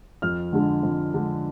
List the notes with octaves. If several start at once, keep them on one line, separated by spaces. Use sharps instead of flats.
F2 F6
D3 G#3 D4
F2
D3 G#3 D4